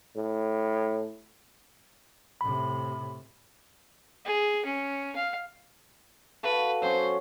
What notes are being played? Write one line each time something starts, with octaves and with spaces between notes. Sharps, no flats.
A2
A2 C3 B5
G#4
C#4
F5
F#4 A4 B4 F5
F#3 C#4 C5